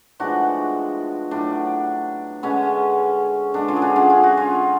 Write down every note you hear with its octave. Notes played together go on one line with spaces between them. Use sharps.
A2 F3 G#3 B3 D4 F#4
A2 F#3 B3 D4
D3 G#3 B3 C#4
D3 G#3 B3 D4
C#4 F4
G#4
D4 F#4
C#4 F4
F4
F#4
C#4 F4